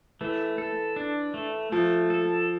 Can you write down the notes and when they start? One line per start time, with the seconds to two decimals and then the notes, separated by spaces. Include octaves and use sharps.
0.21 E3 A3
0.58 A4
0.96 D4
1.34 A3
1.72 F3 A3
2.10 A4